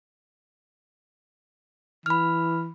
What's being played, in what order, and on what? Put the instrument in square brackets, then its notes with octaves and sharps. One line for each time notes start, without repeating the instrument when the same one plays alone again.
[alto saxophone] E3 [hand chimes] B5 F6